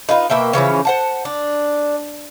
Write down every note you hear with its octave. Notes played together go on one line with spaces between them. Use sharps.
D#4 F4 B4
B2 A#3 E5 G5
C#3 E3 F3 C#4
C5 F#5 A5
D4